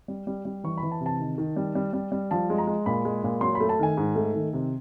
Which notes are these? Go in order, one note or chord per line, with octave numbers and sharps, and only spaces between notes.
G3
G3
G3
E3 C#6
B5
E3
A5
C3
A5
D#3
D#3
G3
G3
G3
G3
F3 A5
G#3
A#5
G#3
A#2 B5
G#3
A#2
F#3 C6
B5
A3
A5
D#3 G#5
G#2
A3
D#3
C3